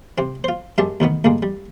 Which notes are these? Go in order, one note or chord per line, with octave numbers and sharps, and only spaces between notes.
C3 C4
F4 C5
F#2 G#3 G4 E5 A5
D2 B2 D#3 B3
D2 G2 D3 G#3 A#3
G3